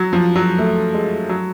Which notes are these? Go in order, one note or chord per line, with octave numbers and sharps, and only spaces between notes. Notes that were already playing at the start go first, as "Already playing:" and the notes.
Already playing: F#3
F3
F#3
A3
G#3
F#3